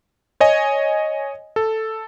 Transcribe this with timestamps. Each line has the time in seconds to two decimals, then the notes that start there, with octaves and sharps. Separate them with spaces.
0.40 C#5 D#5 G#5
1.56 A4